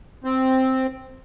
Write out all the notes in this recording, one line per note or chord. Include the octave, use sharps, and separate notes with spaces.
C4